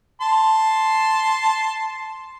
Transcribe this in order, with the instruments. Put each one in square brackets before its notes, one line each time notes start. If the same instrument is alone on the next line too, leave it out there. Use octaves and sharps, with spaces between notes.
[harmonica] A5 C6